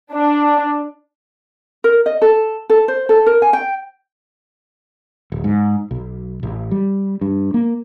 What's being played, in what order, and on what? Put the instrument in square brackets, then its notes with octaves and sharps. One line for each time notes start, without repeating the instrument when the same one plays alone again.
[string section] D4
[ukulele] A#4
D#5
A4
A4
C5
A4
A#4
G#5
G5
[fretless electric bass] D1
G#2
B1
A1
G3
G2
A#3